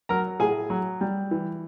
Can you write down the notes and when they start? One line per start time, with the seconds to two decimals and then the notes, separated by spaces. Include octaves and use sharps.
0.09 F#3 A#4 A#5
0.40 A2 G#4 G#5
0.70 F#3
1.01 G3
1.31 E3